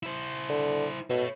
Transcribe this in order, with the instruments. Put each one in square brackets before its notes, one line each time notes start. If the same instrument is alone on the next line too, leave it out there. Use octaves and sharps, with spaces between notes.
[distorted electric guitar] E4 C5
[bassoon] D3
[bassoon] B2 [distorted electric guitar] A4 C#5